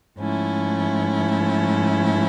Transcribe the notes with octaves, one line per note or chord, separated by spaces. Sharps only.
G#2 F3 A3 C#4 E4